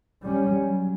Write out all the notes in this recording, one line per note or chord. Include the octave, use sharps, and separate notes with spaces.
G3 C#4
F#3